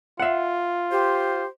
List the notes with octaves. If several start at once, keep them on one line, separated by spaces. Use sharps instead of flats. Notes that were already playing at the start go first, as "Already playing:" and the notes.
F4 E5 F#5
G4 C5